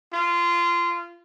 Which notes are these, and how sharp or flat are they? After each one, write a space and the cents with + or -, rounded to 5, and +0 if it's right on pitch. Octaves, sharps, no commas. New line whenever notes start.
F4 -20